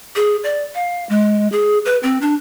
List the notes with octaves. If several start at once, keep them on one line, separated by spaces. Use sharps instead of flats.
G#4
D5
F5
G#3
G#4
B4
C4
D4